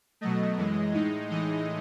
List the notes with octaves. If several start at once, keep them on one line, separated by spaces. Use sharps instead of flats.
B2 F#3 A3 D#5
F#2 E3 G#3
A2 G#3 D#4
A2 E3 G#3 D#4 D#5